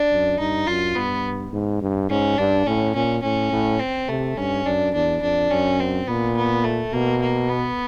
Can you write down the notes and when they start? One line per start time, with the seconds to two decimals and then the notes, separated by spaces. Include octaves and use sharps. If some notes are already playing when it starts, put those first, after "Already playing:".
Already playing: D4
0.11 F#2
0.39 G2 D#4
0.67 F#2 F4
0.96 G2 B3
1.52 G#2
1.81 G2
2.10 G#2 C#4
2.38 G2 D4
2.67 A2 C#4
2.96 A#2 C#4
3.23 A2 C#4
3.52 A2
3.80 C4
4.08 C3 A3
4.37 G2 C#4
4.66 F#2 D4
4.94 E2 D4
5.22 F2 D4
5.51 F#2 C#4
5.80 C4
6.08 A#2 B3
6.36 B3
6.64 A3
6.93 B2 A#3
7.22 A#3
7.49 B3